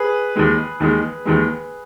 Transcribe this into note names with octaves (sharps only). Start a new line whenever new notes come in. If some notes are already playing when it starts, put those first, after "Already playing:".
Already playing: G#4 B4
D#2 D#3 G#3
D#2 D#3 G#3
D#2 D#3 G#3